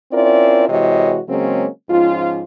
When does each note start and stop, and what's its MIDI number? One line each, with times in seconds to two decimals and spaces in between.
0.13 0.65 60
0.13 0.65 61
0.13 0.65 64
0.13 0.65 65
0.13 0.65 70
0.13 0.65 74
0.68 1.19 48
0.68 1.19 52
0.68 1.19 56
0.68 1.19 66
0.68 1.19 73
0.68 1.19 75
1.28 1.66 49
1.28 1.66 54
1.28 1.66 56
1.28 1.66 58
1.28 1.66 60
1.28 1.66 61
1.90 2.42 44
1.90 2.42 53
1.90 2.42 61
1.90 2.42 65